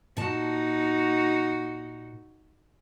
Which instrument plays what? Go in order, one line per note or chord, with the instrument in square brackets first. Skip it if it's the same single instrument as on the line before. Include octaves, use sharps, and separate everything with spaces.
[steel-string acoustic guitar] A#2 A5 [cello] D#4 F#4